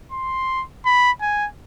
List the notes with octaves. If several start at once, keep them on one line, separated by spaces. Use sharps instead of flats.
C6
B5
G#5